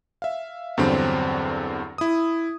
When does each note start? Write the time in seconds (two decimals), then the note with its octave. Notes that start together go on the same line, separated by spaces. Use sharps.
0.22 E5 F5
0.77 E2 G2 D3 F#3 C4
1.98 E4 D#6